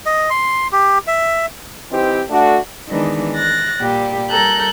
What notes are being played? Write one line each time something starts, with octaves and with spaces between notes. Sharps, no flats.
D#5
C6
G4
E5
E3 C4 D#4 G4 C5
A3 D4 F#4
D#3 E3 G#3 B3 D4 D#4
F#6 A6 A#6
A#2 G3 G4
G3 A4 A#4 A#5 F#6 G6